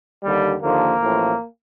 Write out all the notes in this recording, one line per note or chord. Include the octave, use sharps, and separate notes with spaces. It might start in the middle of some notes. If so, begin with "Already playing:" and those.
D#2 D3 G3
D#2 D3 F3 A#3
A1 A2 F3